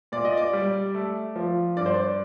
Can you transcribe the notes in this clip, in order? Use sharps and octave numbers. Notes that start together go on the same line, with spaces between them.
A#2 D5
D#5
D5
G3
A3
F3
G2 D5
C5
D5